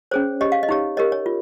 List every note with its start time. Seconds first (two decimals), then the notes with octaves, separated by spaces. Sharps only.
0.11 C#4 G#4 C5 C#5
0.41 G4 C#5 D#5
0.52 F5
0.63 D#5
0.69 D#4 G4 C#5
0.97 G4 A#4 C#5 D#5
1.12 C#5
1.26 F4